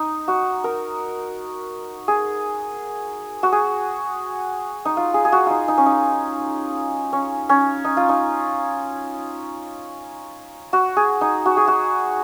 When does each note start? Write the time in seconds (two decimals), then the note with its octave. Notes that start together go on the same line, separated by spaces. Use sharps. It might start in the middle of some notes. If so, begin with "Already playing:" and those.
Already playing: D#4
0.28 F#4
0.64 A#4
2.08 G#4
3.43 F#4
3.52 G#4
4.85 D#4
4.97 F4
5.14 G#4
5.25 G#4
5.32 F#4
5.46 D#4 F4
5.68 D#4
5.78 C#4
5.86 D#4
7.13 C#4
7.49 C#4
7.84 D#4
7.97 F4
8.09 D#4
10.73 F#4
10.97 G#4
11.21 D#4
11.46 F#4
11.57 G#4
11.67 F#4